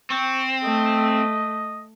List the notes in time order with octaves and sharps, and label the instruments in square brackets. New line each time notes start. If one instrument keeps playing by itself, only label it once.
[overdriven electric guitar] C4 [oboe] C#6
[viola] A3 [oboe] D#5